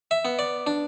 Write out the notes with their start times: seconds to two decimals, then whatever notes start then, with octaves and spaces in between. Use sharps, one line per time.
0.11 E5
0.25 B3
0.39 D5
0.67 D4